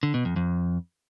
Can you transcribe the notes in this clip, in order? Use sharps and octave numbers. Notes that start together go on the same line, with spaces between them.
D3
B2
F2
F2